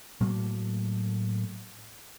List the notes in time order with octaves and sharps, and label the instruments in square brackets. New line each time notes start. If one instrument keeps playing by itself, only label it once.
[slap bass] A2 F#3 A3 A#3